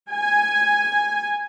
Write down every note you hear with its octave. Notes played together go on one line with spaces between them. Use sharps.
G#5